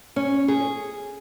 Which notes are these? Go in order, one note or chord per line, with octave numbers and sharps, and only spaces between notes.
C#4
G#4